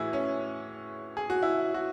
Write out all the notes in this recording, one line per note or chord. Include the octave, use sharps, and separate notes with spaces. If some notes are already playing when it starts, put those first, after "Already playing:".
Already playing: A2 E3 E4 F#4 G#4
C#4
G#4
F#4
E4
F#4